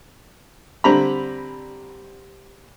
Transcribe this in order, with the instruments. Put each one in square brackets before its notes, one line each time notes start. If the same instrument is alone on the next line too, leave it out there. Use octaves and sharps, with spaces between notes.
[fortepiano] D3 G3 C4 A#5 B5